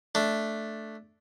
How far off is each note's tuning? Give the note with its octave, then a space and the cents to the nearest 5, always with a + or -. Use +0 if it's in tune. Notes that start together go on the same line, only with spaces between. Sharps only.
A3 +0 D4 +0